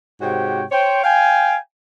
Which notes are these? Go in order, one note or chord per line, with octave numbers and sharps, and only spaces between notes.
G#2 C3 F#4 G4 C#5 G5
C5 C#5 G5
F5 G5 G#5